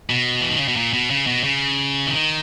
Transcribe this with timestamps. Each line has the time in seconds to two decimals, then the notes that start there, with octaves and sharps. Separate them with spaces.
0.10 B2
0.41 E3
0.50 D#3
0.58 C#3
0.68 B2
0.76 A#2
0.93 B2
1.10 C#3
1.27 B2
1.44 C#3
2.07 E3
2.11 D#3